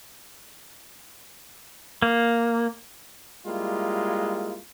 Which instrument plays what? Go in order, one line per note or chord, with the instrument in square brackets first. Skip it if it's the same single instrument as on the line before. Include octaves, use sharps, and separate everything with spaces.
[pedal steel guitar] A#3
[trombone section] G3 G#3 A#3 E4 F4